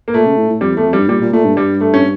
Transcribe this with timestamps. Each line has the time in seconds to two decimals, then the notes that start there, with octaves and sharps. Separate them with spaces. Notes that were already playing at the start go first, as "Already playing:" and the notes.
0.08 A#3
0.14 A#2 A3
0.26 C#3
0.37 A2
0.49 A2
0.61 F2 G3
0.74 E2 A3
0.86 F2
0.93 G2 G3
1.09 A#2 G3
1.21 A#2
1.33 A#2 A3
1.45 G2
1.57 G3
1.81 A3
1.94 C#4